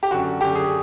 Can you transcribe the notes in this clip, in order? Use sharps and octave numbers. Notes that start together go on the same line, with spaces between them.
G4
F#2 D3 F#4
F#2 D3 G4
G#4